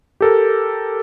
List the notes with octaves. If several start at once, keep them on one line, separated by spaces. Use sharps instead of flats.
G4 A4 A#4